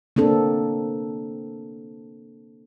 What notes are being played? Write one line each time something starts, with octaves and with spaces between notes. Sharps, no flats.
A#3 C4 D4 A4